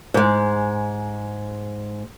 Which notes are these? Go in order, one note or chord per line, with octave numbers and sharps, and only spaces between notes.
G#2 G#3